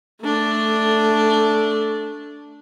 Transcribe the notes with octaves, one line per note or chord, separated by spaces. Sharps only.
A3 D4